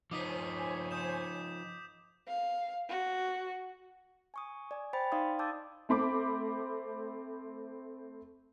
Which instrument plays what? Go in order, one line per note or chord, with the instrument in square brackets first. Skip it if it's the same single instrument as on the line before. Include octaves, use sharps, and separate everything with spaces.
[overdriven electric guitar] F3 D#4 [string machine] C5 C#5 G#5 [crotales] D6 D#6 B6
[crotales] D#6 G6 E7
[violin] F5
F#4
[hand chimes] G#5 C#6 D#6
D5 G#5
C5 G5 B5 A6
D#4 D5 F5 C6 D#6
A5 D6 E6 G6 A6
[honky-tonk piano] A3 C4 B5 D6